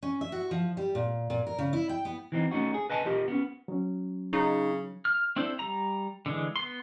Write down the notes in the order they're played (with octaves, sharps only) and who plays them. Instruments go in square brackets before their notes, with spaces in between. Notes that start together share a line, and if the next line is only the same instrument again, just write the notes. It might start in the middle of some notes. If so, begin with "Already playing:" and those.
[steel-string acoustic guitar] C#4
E5
F#4
F3
G3
A#2
A#2
A#4
C#3
E4
G5
B3
[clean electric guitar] E3 C4 D#4
A3 C#4 D#4 F#4
G#4
B4 D#5 G#5 A5
F4 G4 A#4 D#5
B3 C#4
[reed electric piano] F#3 C#4
[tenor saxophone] C#3 [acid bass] D#4
[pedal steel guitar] F6
C4 D4 E4 A4 C5
G3 A#5
D3 E3 G#3
B3 C6